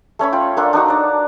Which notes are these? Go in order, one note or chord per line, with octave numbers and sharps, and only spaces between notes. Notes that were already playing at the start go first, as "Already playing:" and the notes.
A3 C#4 C#5 B5
F4 G5
A#3 D4 F4 A4
D4 D#4 F#4
D5 A#5